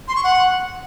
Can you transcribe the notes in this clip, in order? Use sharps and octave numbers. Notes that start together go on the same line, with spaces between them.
C6
C#6
F#5